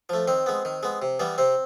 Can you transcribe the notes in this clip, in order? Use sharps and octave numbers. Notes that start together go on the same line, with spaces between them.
F3 A3
D#3 C4
G#3 B3
D#3
G#3 B3
C3
E3 G3 B3
C3 C4